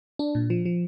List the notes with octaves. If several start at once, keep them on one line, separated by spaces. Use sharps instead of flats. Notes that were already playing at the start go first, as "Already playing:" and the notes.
D4
A#2
F3
F3